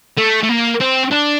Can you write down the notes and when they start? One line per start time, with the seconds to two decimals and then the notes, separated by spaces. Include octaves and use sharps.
0.18 A3
0.43 A3
0.49 A#3
0.80 C4
1.11 D4